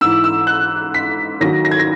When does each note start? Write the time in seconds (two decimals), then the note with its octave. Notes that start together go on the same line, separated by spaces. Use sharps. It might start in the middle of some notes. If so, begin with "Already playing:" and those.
0.01 G#2 E3 E6
0.24 E6
0.47 F#6
0.94 B6
1.41 D#2 D#3 F#3 A#6
1.65 A#6
1.71 G#6
1.79 A#6